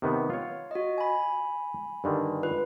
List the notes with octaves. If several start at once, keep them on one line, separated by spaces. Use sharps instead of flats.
C3 D#3 B3
F4 C#5
F#4 D#5
G#5 B5
G2 D3 D#3
F4 B4